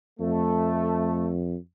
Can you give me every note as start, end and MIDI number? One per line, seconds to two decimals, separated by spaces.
0.20 1.56 41
0.20 1.33 57